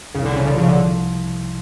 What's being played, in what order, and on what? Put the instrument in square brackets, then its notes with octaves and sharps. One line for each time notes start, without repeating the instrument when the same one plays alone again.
[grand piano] C2 [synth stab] C#3
[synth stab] D3
C#3
D3
[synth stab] C#3 [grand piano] F3
[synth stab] D3